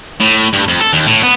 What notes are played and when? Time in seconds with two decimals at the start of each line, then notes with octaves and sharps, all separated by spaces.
0.21 A2
0.53 G2
0.68 F2
0.81 A4
0.93 D#2
1.07 A2
1.23 B3